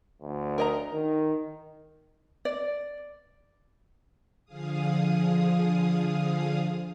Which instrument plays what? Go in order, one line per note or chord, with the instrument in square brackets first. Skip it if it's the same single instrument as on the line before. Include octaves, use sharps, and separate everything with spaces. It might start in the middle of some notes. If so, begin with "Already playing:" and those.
[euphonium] D2
[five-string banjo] A#4 D#5 A#5
[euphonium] D#3
[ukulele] D5
[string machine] D3 F3 G#4 F5 D#6